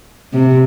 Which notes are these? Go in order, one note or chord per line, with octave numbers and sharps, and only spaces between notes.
C3